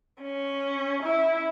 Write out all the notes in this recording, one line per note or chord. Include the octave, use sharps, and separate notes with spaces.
C#4
E4